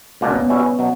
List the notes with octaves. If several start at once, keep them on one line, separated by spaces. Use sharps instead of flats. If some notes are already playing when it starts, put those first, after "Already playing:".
C#2 B2 A#3 D4
C#4
B3
B2 G3 C#4 E4
B2 F#3